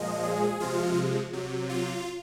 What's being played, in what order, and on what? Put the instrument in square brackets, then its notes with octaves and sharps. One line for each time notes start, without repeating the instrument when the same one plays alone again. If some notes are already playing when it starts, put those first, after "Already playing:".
Already playing: [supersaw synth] A#2 F3 G#3 D#5
G#4
C3 F3 G#3 F4
C3 F#3
F4